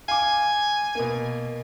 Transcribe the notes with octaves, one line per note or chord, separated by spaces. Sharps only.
F5 G#5 D6
B2 A#3